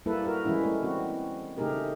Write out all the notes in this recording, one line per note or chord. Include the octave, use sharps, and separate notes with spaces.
G3 A#3 E4 A4 B4
F#4 A#4 B4
E3 G3 G#3 C#4 E4
A3 A#4
G#3 C4 F#4
C#3 A3 D#4 G4 G#4 A#4